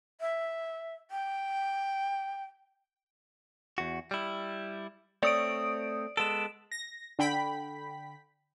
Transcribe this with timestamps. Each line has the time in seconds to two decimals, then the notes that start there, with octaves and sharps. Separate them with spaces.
0.21 E5
1.11 G5
3.78 E2 F#4
4.11 G3 E4
5.23 A3 C4 C#5 D5 D#6 D7
6.17 G#3 B3 A4 D7 E7
6.72 A#6
7.19 D3 G5 B5 B6